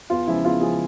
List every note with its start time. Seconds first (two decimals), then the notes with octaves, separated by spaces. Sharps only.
0.10 E2 F4
0.27 C#3 F3 G#3 E4
0.44 E2 F4
0.61 C#3 F3 G#3 G#4